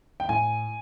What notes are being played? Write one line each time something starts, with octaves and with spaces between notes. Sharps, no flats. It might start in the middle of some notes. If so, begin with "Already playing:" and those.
G5
A2 G#5